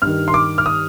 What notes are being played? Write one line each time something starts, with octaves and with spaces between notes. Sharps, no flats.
G2 D#3 F6
C6
D6
F6
D#6